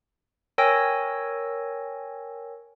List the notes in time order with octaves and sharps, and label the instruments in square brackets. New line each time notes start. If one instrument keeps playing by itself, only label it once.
[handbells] A#4 C#5 G5 G#5 E6 A#6